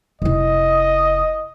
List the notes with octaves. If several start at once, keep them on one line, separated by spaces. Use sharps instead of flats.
F1 E4 D#5